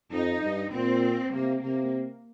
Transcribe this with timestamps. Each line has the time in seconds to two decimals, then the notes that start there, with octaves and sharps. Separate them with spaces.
0.12 F2 D#4
0.42 G2
0.72 A#2 C4
1.34 C3 A#3
1.63 C3 A#3